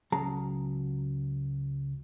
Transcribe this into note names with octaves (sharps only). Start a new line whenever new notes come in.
C#2 F#3 C#4 G#4 A5 A#5